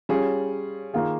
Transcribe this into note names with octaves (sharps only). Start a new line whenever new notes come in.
G3 C#4 F4 G#4
D#3 A#3 F4 G#4